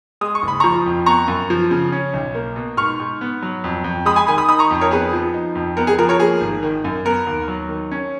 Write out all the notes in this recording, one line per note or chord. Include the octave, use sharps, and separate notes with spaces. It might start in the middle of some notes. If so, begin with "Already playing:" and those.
G#3 D#6
C#6
F#1
B5
F3 A#5 C#6
F2
B3 A#5 C#6
F#2
F3
C#3
C#4
B1
A#3
B2
G#2 C#6 F6
G#2
B3
F#3
F2
F2
G#3 B5 D#6
G#5 B5
D#3 G#5 B5
B5 D#6
D#4 B5 D#6
A#5 C#6
F2
A#4 C#5
B3 G#4 B4
F3
D#4
F2
B3 A#4
G#4
F3 A#4
A#4 C#5
A#3 G#4
G#1
D#3
F#2
B3 A#4
D#2
F#3
D#3
C#4